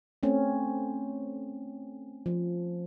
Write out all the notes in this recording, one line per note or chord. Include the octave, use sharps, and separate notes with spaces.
A3 C4 C#4
F3